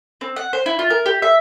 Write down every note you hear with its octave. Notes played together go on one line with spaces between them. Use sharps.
C4
F#5
C5
E4
F4
A#4
G4
E5